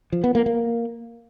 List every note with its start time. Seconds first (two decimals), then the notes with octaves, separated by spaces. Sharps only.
0.12 F3
0.24 B3
0.35 A#3
0.46 A#3